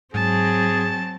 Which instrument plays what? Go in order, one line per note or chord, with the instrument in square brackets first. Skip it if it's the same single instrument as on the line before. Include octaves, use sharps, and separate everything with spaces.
[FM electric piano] G#2 [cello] F#3 C4 [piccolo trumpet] G#4 [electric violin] A5